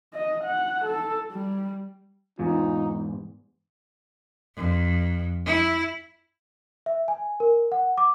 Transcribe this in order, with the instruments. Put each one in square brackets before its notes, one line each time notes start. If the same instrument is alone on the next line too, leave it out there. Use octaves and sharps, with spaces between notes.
[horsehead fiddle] D#5
F#5
A4
G3
[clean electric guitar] E2 G#2 [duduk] D#4 [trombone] F4
[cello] F2
E4
[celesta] E5
G#5
A#4
F#5
D6